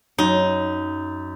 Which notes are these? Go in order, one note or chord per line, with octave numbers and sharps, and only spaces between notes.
F#2 D#4